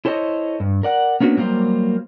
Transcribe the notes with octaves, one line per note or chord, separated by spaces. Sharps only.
E4 A4 C5 C#5 D#5
G2
A#4 D5 F#5
A#3 B3 C#4 D4 F#4
F#3 G3 A#3 A#4 C5